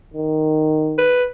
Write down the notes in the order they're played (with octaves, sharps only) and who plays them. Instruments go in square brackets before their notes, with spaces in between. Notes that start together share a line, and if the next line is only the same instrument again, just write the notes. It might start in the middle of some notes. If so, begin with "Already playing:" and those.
[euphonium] D#3
[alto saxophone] B4